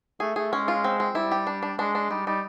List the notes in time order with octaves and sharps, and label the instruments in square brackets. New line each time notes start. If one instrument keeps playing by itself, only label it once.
[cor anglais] A3 [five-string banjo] G#4
[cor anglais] A3 [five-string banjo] G#4
[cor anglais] G#3 [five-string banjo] C#4
[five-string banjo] F4
C4
C4
[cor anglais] G3 [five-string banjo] E4
[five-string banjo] G4
D4
D4
[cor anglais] G#3 [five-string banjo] D4
[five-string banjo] D4
[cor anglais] G3 [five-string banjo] D#4
[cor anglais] G3 [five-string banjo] D#4